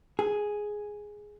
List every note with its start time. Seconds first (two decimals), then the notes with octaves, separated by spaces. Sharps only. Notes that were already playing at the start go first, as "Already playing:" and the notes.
0.19 G#4